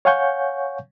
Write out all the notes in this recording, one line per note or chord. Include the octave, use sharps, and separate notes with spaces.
C#5 F5 F#5 G#5 C#6 G6